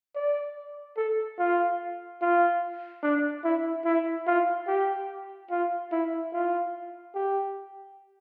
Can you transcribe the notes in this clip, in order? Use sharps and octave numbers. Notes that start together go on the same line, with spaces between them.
D5
A4
F4
F4
D4
E4
E4
F4
G4
F4
E4
F4
G4